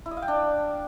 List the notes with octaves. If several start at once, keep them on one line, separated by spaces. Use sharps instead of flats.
E4
D#5
F5
G5
D4